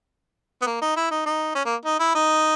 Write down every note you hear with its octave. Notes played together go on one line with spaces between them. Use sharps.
B3
A#3
D#4
E4
D#4
D#4
C#4
A#3
D#4
E4
D#4